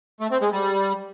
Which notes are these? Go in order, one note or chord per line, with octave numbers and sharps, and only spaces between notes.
A3
C4
G#3
G3